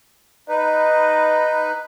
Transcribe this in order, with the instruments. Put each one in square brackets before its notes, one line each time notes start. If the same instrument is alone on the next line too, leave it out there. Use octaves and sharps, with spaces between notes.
[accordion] D#4 B4 [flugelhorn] D#5